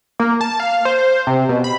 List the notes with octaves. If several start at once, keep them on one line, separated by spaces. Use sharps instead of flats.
A#3
A5
F5
C5
C3
B2
B5